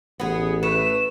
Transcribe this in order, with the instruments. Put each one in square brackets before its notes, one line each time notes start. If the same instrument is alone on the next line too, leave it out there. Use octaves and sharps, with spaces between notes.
[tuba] A1 [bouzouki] B3 G#4
[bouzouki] A3 [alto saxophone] B4 [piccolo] E7